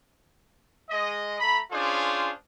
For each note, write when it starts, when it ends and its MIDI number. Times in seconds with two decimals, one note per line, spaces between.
0.90 1.38 56
0.90 1.38 75
1.40 1.59 57
1.40 1.59 82
1.40 1.59 83
1.71 2.31 61
1.71 2.31 62
1.71 2.31 65
1.71 2.31 68
1.71 2.31 72